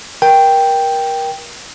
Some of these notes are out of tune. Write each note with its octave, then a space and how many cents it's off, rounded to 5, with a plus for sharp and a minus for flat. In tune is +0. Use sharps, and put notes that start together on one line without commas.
A#4 +25 G5 +0